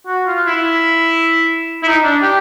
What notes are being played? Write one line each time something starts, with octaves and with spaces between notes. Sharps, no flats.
F#4
F4
E4
E4
D#4
D4
G4